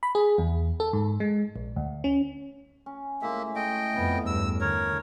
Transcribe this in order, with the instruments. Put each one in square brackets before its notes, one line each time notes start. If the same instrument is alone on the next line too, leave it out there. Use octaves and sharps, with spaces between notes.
[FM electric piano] B5
G#4
E2
A4
G#2
G#3
A#1
D2
C#4
[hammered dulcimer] C#4
[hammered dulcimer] A2 G#3 [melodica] A#3 E5
[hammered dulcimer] A3 [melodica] D#5 G5
[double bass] F2 B3
[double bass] E2 G2 [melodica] E6
[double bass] D3 [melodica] A#4 C#5